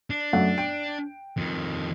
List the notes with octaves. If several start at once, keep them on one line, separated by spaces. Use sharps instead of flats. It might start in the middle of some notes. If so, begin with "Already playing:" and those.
D4
F#2 A3 F#5
G5 D7
F2 D#3